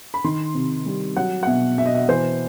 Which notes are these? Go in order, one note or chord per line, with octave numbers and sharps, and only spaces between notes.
B5
D#3 C6
C3
G3
F#3 F#5
F#5
B2 E5
B2 E5
D#5
E5
E3 C5